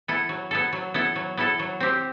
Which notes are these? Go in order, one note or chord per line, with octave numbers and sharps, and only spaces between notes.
B3 E4 A4
F#3
B3 E4 A4
F#3
B3 E4 A4
F#3
B3 E4 A4
F#3
C4 G4